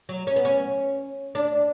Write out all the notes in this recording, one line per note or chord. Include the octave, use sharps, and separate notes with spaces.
F#3
C#4
B3
C#4
D4